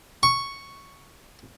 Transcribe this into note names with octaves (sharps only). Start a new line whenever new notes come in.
C#6